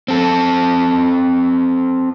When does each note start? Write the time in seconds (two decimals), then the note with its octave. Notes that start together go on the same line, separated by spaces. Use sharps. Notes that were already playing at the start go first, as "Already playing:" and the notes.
0.08 C4 A4